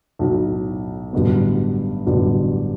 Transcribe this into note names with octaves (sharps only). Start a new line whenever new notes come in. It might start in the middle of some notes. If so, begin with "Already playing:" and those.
B1 A2 F#3 A3
A1 G2 D3 F#3 B3
A1 G2 D3 F#3 B3